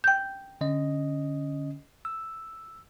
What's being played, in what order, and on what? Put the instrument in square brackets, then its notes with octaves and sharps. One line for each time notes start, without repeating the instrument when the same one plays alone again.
[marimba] G5 G6
[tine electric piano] D3 C#4 D#5
E6